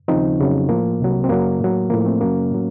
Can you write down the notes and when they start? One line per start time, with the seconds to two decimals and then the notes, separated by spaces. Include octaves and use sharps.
0.08 D#2 C#3 F3 C4 D#4
0.40 F2 C#3 F#3
0.69 A2 F3 A#3
1.00 C2 C3 F#3
1.24 C4
1.29 F#2 C#3 F#3 A#3
1.60 A2 F#3
1.90 A2 F3 A#3
2.05 A3 C4
2.21 F#2 C#3 F#3 A#3 C#4
2.51 A2 F#3